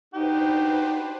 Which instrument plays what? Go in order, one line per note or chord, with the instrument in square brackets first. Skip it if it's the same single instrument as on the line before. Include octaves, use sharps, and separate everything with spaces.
[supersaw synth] D4 B4 C5 [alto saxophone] D#4 [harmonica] F#4 G4